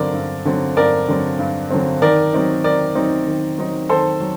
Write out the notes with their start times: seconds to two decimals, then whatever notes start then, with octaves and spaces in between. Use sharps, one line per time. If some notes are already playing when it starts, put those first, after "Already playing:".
Already playing: G2 D3 F#3 C4 A#4 D5
0.14 G2
0.45 D3 F#3 C4
0.77 G2 A#4 D5
1.08 D3 F#3 C4
1.39 G2
1.70 D3 F#3 C4
2.02 D#3 A#4 D5
2.33 F#3 C4 D#4
2.64 D#3 A#4 D5
2.95 F#3 C4 D#4
3.27 D#3
3.58 F#3 C4 D#4
3.89 D#3 A4 C5
4.20 F#3